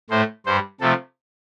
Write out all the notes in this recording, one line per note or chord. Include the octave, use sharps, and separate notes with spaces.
A2 A3 C5
G2 G3 C5
C3 F3 A3 A4